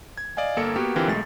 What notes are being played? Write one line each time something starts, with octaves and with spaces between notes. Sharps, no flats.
G#6
D5 D#5 F5 G#5
G1 A#3 A4 A#4 C#7
A#3 B3 F#4 G4
D3 E3 C4 F4 G4 A#4
B1 G#3 A3 A6